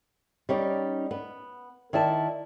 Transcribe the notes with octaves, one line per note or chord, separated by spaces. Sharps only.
G3 C#4 D#4 D5
B3
D#3 E4 D5 A5